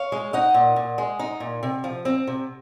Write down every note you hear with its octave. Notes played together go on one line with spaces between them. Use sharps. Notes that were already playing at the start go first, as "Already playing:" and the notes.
Already playing: C#5 F5
G#3
D#4 D#5 F#5
A#2
A#2
G#3
D#4
A#2
C3
F3
C4
C3